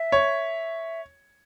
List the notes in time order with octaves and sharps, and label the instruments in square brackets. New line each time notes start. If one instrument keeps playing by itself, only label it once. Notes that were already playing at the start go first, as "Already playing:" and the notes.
Already playing: [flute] E5
[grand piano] C#5